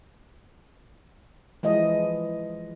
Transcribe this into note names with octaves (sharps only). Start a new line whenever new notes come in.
E3 F3 G#3 D#5